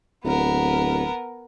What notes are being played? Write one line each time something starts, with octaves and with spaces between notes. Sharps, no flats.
D1 B3 A#4